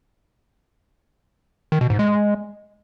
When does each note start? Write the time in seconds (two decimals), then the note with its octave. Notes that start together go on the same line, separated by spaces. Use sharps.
1.72 D#3
1.81 B2
1.90 G#2
1.99 G#3